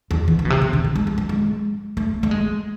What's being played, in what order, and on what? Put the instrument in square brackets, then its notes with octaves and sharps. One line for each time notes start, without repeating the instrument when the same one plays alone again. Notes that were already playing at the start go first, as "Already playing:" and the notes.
[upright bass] E2
E3
D3
B2
C3
C3
D3
E3
G#3
F3
F3
G#3
A3
A3
G#3